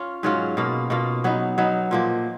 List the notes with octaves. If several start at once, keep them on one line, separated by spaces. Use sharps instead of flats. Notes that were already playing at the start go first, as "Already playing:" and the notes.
Already playing: C#4 F4
G#2 F#3 C#4 F4
B2 A#3 F4
B2 A#3 F4
F#3 B3 D#4
F#3 B3 D#4
A#2 F3 A#3